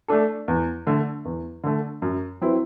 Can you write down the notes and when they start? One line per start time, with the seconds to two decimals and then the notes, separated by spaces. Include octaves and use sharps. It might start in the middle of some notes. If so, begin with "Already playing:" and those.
0.08 A3 D4 A4
0.48 E2
0.87 D3 A3
1.25 E2
1.64 D3 A3
2.02 F#2
2.41 F#3 C4 E4 B4